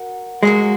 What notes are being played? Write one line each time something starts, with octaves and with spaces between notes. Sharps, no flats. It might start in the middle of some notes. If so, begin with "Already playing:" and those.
Already playing: F#4 A#4
F#3 G#3 A#3 F#4